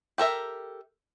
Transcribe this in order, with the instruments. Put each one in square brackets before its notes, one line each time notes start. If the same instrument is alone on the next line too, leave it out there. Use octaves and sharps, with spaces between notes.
[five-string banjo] G4 A4 A#4 E5